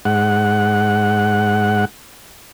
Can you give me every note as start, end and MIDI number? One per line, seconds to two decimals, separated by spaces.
0.05 1.85 44
0.05 1.85 78